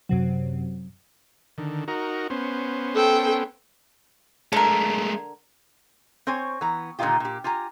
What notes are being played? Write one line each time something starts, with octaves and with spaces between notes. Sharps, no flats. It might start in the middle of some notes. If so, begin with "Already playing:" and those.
F#2 C3 F#3
D3 D#3
D#4 F#4 A#4
B3 C#4 C5
A4 G5
D3 G#3 A3 A#4
C4 C5 C#5 G#5
E3 B3 A#5
A#2 D3 D#3 D#4 F4 G4
A#2 G4
F4 G4 G#5 A#5